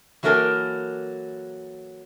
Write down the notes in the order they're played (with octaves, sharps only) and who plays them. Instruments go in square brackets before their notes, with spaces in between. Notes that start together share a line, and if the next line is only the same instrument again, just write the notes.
[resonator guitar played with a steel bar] E3 F#3 A#3 A4 A#4 G#5